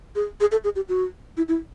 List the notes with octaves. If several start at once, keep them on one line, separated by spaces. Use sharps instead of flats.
G#4
G#4
A4
G#4
G4
F#4
E4
E4